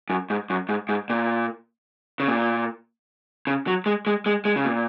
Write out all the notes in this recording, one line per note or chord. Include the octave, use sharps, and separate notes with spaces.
F#2
G#2
F#2
G#2
G#2
A#2
C#3
A#2
C#3
F#3
G#3
G#3
G#3
G#3
C#3
A#2